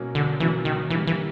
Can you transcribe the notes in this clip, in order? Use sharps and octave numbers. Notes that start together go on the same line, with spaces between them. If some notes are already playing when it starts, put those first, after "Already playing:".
Already playing: B2 F#3 A#3 C#4
D3
B2 E3 F#3 A#3 C#4
D#3
D3 E3 G3 A#3
E3